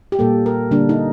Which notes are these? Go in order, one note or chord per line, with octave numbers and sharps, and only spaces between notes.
G4
A#2 G3 A#3 A4
A#4
D3 G3 A#3 D4
D#4